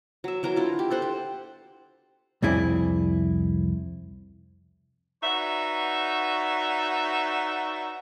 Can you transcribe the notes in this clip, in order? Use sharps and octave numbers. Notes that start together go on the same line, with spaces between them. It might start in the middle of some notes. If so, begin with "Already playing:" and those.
F#3 E5
E3 F#3 A#4 A#5
D4 E4 F4
G4
A4 C5 F#5
G4
C2 F2 C4 E4 G#4 D5
D#4 F#4 B4 C#5 D5 E5